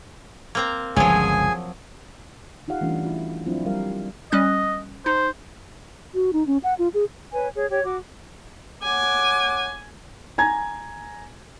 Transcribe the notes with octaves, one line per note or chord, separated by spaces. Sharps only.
A#3 C4 A#5
G1 C#2 F3 F#3 G#4 G#5
D#4 F4 G4 F5 F#5
E3 G3 A3 C#4 D4 F4
E4 F#4
F3 F#3 C4 D4 E4 F4
F3 G3 A#4 F5
G3 C#4 D#5 F#6
D#4 C5
F#4
D#4
C#4
F#5
F4
G#4
B4 C#5 G#5
G#4 C#5
G4 C#5
F#4 D6
C#5 F#5 G#5 D6
G#5 A#5 G#6